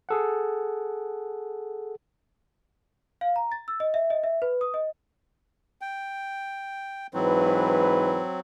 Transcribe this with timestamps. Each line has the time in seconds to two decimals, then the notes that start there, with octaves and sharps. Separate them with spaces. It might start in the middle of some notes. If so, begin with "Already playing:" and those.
0.09 G#4 A4 F#5
3.21 F5
3.36 A#5
3.52 A6
3.68 E6
3.80 D#5
3.94 E5
4.10 D#5
4.24 E5
4.42 B4
4.61 D#6
4.74 D#5
5.81 G5
7.14 G#2 E3 F#3 C4 B4